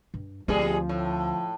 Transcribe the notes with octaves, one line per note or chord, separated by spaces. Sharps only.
G2
D2 A#2 F3 G3 C4 G#4
A2